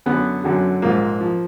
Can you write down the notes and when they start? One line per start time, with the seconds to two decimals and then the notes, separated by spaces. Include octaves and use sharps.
0.06 F#2 D3 F#3 B3
0.44 F#2 D3 F#3
0.82 A#1 G#2 F3 A#3
1.21 F3